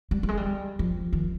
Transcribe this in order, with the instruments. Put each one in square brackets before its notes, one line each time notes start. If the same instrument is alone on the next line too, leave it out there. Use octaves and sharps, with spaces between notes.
[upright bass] G3
G3
G#3
G3
F3
D#3